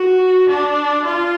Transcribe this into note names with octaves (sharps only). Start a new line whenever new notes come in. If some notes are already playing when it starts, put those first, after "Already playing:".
Already playing: F#4
D4
F4